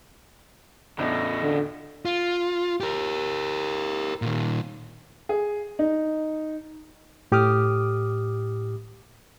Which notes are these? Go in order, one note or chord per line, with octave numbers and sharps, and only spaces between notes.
E2 A2 C#3 A3 D4 D#5
D3
F4
G4 A#4
A#2 D#3
G#4
D#4
A2 G4 D6 D#6 F6